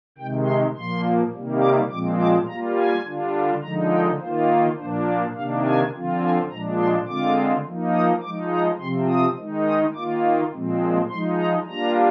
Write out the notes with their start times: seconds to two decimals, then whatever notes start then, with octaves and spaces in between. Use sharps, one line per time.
0.18 C3 D#3 G#3 G5
0.46 C6
0.74 A#2 F3 A#3 C6
1.33 C3 D#3 G3 A#3
1.61 D6
1.90 A#2 F3 G#3 C4 D6
2.19 D6
2.47 G3 A#3 F4 A#5
2.76 G#5
3.05 D3 G3 D4 F4
3.62 D3 F3 G#3 D#4 A#5
3.92 G5
4.19 D#3 A#3 F4 C5
4.49 A#4
4.77 A#2 F3 A#3 D4 C5
5.05 D5
5.34 C3 D#3 A#3 D4 F5
5.63 G#5
5.93 D3 F3 C4 F4
6.21 G#5
6.49 A#2 F3 G#3 D4 A#5
6.79 C6
7.07 D3 G#3 C4 F4 D6
7.64 F3 A#3 D#4
7.93 D#6
8.21 F3 G#3 D#4 D6
8.51 A#5
8.79 C3 F3 C4 C6
9.08 D#6
9.37 D#3 G#3 D#4
9.66 D#6
9.95 D#3 A#3 F4 D6
10.52 A#2 F3 G#3 C4
11.10 F3 G#3 D#4 C6
11.37 A#5
11.67 G3 A#3 D4 F4 A#5